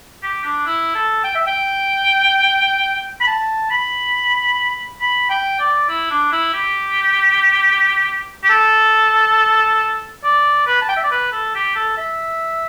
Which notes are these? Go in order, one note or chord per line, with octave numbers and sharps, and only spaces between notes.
G4
D4
E4
A4
G5
E5
G5
B5
A5
B5
B5
G5
D5
E4
D4
E4
G4
G4
A4
D5
B4
A5
G5
E5
D5
B4
A4
G4
A4
E5